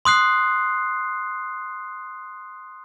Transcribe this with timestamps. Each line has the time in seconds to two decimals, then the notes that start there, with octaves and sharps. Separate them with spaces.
0.05 C6 D#6 F#6 C7